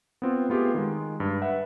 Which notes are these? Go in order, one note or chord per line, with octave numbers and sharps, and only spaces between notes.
B3 C4 F4
A3 B3 F4 G4 G#4
D#3 G#3
G2
B4 E5 F#5